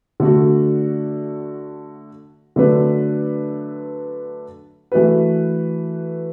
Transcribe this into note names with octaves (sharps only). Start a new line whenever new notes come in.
D3 A3 F#4
D3 F#3 A3 D4 B4
E3 A3 F#4 B4